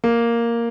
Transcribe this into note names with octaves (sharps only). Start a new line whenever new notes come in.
A#3